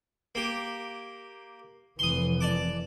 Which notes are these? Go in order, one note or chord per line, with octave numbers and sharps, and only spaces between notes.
A#3 G4
F1 E3 C6 D#6
D5 A5 D6